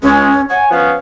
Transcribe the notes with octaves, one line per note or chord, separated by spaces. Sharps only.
C#2 G#3 C#4
C#5 F#5 G#5
F3 B3 C#4 F5